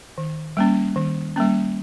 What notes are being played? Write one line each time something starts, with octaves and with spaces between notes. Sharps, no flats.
D#3
G3 A#3 C#4
D#3
G3 A#3 C#4